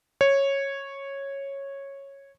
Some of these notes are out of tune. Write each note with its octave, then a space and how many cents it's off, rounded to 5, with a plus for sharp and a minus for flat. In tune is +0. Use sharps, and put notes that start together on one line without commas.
C#5 -10